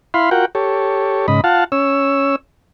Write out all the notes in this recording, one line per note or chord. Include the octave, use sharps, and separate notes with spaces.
E4 F5 B5 C6
F4 F#4 A#4 F#5 G5
G4 A4 C#5
G#2 C#3 D#5 B5
F4 F5 F#5 A5
C#4 C#5 E6